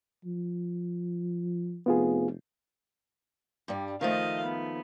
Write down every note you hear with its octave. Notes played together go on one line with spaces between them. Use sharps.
F3
F1 B3 F4 G#4
G2 G3
D#3 F3 A3 D#5 F5
B3